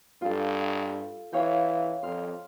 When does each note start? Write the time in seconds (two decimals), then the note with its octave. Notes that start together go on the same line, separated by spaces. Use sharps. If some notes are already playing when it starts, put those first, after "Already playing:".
0.21 G2 F4 A4
1.33 E3 C#5 F5 G5
2.03 F2 C6 F6